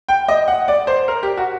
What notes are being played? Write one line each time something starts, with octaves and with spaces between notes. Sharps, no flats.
G5
D#5
F#5
D5
C5
A#4
G4
F#4